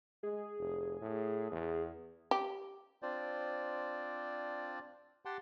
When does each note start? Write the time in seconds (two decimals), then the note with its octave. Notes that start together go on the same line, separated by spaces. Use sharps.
0.23 G#3 G#4
0.59 F1
1.01 A2
1.52 E2
2.31 G4
3.02 C4 D4 F4 C5 D5
5.25 G4 F#5 G5 A5 C6